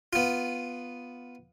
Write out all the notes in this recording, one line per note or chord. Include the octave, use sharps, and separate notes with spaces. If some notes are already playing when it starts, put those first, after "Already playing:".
B3 F4